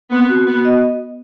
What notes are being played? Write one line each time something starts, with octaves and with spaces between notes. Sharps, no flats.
B3 C4
F#4
B3 F#4
D#5